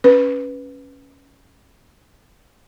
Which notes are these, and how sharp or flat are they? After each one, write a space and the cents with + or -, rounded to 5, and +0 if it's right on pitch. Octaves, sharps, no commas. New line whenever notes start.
C#4 +0 B4 +0